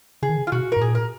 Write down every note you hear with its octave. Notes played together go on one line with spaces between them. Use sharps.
C#3 G#4
D#3
C#3
F4
B2 F#4
A#4
G#2
A#2 G#4
A#4